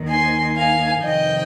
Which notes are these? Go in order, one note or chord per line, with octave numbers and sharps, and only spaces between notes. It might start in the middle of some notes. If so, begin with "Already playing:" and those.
Already playing: D#2 D#3
G#5 C6
F5 G#5
F2 C3 D#3 D#5 G5